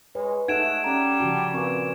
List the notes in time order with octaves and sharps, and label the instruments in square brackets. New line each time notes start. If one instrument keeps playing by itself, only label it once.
[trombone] G#3 [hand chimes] B4 [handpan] C#5
[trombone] A3 [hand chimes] D#4 [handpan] G#4 A4 F#5 [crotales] G#6 D7 E7
[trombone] G3 [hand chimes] C#4 A#5
[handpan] C#3 F3 F#4 [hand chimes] A5
[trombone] A#2 [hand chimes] C4 F#4 C#6 [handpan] A#4 B4